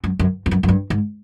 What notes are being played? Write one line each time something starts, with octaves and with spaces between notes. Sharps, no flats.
F#2
F#2
F2
F#2
F#2
G2
G#2